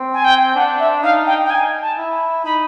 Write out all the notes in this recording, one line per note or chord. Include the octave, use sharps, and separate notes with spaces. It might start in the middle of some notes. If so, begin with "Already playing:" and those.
Already playing: C4
G#5
G5
D4 F#5
E5
D#4 F5
G5
G5
G#5
A5
E4
D#4 B5